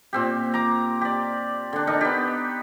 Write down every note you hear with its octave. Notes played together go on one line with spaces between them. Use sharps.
A#2 C4 G4
A#5 D6
G4 D5
D3 D4
D4 D#4 A#4
B3 G4